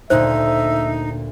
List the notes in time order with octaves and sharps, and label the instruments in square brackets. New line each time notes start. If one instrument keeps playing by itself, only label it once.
[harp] D2 A#2 [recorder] D#4 [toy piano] C5 [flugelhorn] E5